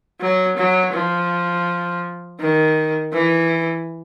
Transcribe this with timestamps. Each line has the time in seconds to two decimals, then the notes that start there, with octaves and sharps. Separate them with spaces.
0.20 F#3
0.57 F#3
0.93 F3
2.40 D#3
3.13 E3